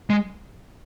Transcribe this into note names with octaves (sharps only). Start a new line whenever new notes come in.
G#3